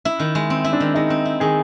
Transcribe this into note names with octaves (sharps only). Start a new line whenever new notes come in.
E4
D#3
G#3
C4
E4
D4
D#3
G#3 D#4
C4
E4
D#3 G#4